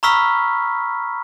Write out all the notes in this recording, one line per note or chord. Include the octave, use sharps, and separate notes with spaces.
A#5 B5 C#6 E6 F6 B6